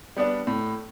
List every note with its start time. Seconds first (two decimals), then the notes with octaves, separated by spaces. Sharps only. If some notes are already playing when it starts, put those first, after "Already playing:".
0.17 G3 B3 D4
0.47 A2